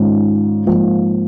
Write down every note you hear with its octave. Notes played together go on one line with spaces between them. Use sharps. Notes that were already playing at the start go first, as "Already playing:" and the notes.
Already playing: G#2 D#3 C#4 F4
G#2 F3 A#3